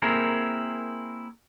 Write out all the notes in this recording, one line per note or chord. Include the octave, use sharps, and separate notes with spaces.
A#3 C4 E4 G#4 A#4